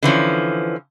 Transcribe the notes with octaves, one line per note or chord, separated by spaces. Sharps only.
D3 E3 F3 C#4